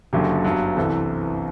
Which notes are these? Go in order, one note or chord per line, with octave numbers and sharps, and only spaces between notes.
F#1 F#2 D3 F#3 G4
G1 G2 F#3
C2 C3 E3 A4